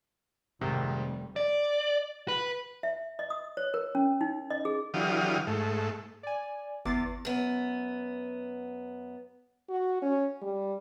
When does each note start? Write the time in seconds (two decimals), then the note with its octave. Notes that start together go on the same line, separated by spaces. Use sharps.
0.61 F1 G#2 C3 D#3 G3
1.36 D5
2.28 B4
2.83 E5
3.19 D#5
3.30 D#6
3.57 C#5
3.74 A#4
3.95 C#4
4.21 D#4
4.51 D#5
4.65 G#4
4.94 D3 E3 F#3 G4 F5 D#6
5.47 G#2 A3
6.23 D5 G#5
6.85 G1 E2 D6 A6 C7
7.25 F#2 B3
9.69 F#4
10.02 C#4
10.42 G3